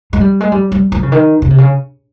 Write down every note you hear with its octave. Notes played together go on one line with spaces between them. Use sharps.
G#3
G3
G#3
G3
G3
F3
C#3
D#3
C#3
C3
C#3